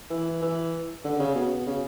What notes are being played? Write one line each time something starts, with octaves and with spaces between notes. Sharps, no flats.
E3
E3
D3
C#3
B2
C#3